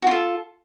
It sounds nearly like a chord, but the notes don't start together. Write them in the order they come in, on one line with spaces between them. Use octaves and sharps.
F#4 F4 A4